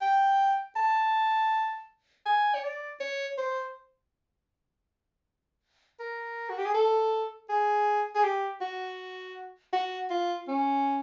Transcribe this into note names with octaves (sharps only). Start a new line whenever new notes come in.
G5
A5
G#5
C#5
D5
C#5
C5
A#4
F#4
G4
G#4
A4
G#4
G#4
G4
F#4
F#4
F4
C#4